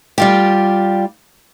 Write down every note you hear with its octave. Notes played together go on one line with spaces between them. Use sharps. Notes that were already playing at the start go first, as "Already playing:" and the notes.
G3 F4 G4